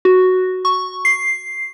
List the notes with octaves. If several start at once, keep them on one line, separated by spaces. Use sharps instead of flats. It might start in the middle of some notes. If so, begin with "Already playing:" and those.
F#4
C#6
C7